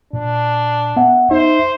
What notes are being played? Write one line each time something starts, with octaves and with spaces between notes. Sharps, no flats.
A#2 D4
B3 E5 F#5
D#4 C5 E5